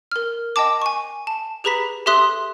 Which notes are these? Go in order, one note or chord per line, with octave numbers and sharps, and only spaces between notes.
A#4 F6
D#5 G5 A5 D6
G#5 C#6
A5
G4 G#4 B4 A#5 B5 B6
G4 A4 E5 C6 D#6 F#6